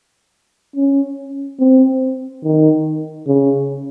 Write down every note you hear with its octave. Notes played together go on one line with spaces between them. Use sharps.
C#4
C4
D#3
C#3